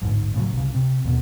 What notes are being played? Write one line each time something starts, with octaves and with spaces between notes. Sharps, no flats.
A1 D2 G#2
A2 C#3 E3 F#3
C2 C#3
C3
D#2 B2